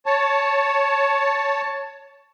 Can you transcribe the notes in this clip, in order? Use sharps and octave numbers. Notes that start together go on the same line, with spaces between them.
C#5 A5